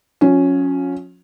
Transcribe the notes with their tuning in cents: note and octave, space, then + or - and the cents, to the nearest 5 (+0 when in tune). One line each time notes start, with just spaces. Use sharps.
F3 +45 C#4 +0